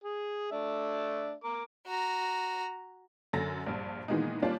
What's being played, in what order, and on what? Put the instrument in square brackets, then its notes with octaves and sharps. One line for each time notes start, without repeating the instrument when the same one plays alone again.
[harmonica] G#4
A3 D4 E5
A#4 D6
[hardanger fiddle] F#4 A#5
[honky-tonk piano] F#2 D3 A6 A#6
A#1 G2
A#2 D#3 E3 G#3 B3 D#4
G3 A#3 C#4 D4 F4